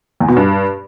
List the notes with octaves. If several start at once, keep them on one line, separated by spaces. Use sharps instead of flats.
E2
B2
G2